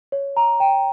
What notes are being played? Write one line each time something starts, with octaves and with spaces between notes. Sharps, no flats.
C#5
A#5
G5